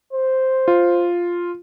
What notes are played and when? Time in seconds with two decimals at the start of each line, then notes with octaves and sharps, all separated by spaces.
0.13 C5
0.68 F4